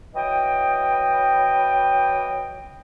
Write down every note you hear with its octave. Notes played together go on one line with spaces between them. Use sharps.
E3 F#3 D#5 G5